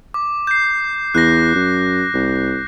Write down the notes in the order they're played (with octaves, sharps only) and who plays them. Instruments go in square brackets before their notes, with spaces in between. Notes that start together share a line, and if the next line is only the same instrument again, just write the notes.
[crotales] D6
G6 C7
[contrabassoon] E2 [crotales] F#6 A#6
[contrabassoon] F#2
C2